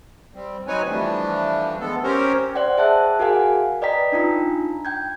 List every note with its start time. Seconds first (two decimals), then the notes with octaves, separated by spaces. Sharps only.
0.34 G3 C4
0.67 F#3 C4 D#4 B4 C#5 G#5
0.89 E3 F3 G3 A3 D4
1.80 G#3 B3 A4
2.04 C4 C#4 G4 A#4 C5 C#5
2.55 C5 D5 F#5 G5
2.78 G#4 E5 A5 F#6
3.19 F#4 G#4 A#4 F5 F#5 G#5
3.82 B4 D5 D#5 G5 A#5 B6
4.12 D4 D#4 F4 A#5
4.85 G5 G6 G#6